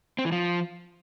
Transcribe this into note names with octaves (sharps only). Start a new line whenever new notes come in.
C4
E3
F3